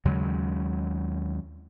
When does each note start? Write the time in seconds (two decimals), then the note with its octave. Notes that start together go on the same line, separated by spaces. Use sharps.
0.05 D#2 C#3 F#3 G#3